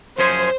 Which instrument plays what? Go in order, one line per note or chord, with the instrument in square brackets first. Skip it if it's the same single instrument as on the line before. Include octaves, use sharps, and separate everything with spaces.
[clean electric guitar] F#2 F3 G#3 C#4 G#4 [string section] C5